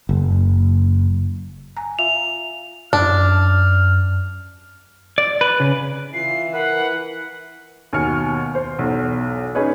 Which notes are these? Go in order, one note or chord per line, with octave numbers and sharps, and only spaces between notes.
F#1
G#5 A#5
F4 E5 F5 F7
F#2 D4 F6
D5
B4
C#3
E3 F4 C7
A#4 B4 F#5
D#2 B2 G#5 F6 C#7
C5
B1 E2
C#4 D#4 G#4 B4 C#5